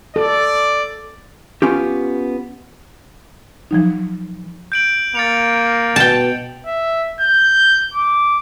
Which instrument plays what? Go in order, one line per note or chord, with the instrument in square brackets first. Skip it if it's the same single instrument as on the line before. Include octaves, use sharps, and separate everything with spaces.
[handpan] A4 [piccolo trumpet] D5
[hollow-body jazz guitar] B3 C#4 F4 G4
[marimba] F3 F#3 D#4
[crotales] G6 D7 F#7
[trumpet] A#3 [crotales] A6 C#7 F7
[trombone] B2 [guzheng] G5 A5
[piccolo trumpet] E5
G6
D6